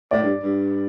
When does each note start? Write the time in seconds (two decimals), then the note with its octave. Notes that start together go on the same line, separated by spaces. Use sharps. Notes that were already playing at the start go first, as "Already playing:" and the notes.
0.11 A2 D5
0.22 G2
0.43 G2